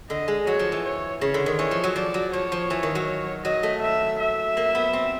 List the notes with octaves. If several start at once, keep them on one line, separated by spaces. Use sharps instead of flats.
D3 D#5
G#3
F#3 C#5
F3
E3
C#5
C#3 C#5
D3
D#3
E3 C#5
F3
F#3
F3 D5
F#3
F3 C#5
F3
E3
D#3
F#3
F#3 D#5
A3
E5
E5
A#3
B3
C4